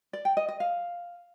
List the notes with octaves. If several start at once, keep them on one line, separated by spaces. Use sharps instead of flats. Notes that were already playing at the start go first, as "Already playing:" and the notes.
D5
G5
D#5
D#5
F5